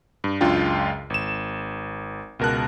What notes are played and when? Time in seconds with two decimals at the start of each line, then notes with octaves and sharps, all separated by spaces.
0.24 G2
0.41 C#2 F#2 D4 F4 G5
1.10 G#1 E7
2.39 C#2 B2 A#4 A5 F#6